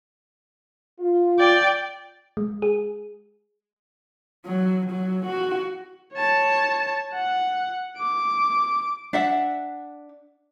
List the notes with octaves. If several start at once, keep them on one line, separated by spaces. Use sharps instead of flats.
F4
D5 G5
G#3
G#4
F#3
F#3
F#4
C#5 A5
F#5
D6
D4 E5 F#5